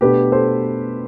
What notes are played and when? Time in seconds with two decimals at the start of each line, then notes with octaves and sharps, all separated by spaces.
0.01 B2 A3 D4 G4 B4
0.32 A4 C5